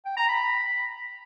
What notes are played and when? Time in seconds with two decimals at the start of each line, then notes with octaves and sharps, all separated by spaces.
0.05 G5
0.17 A#5
0.28 B5